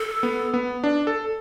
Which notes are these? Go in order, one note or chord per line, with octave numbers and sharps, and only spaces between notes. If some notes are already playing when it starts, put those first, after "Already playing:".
Already playing: A4
B3
B3
D4
A4